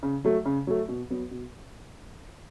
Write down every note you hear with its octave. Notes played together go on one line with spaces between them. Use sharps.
C#3
F#3 A3
C#3
F#3 A3
B2
F#3 B3
B2